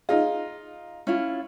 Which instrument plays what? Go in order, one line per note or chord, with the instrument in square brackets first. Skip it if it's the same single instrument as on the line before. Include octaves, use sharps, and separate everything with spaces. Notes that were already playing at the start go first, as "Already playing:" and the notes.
[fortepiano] D#4 F4 [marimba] G#4 D#5
[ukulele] C#4 E4 F4